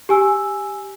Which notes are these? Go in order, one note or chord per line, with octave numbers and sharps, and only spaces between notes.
G4 G#5 E6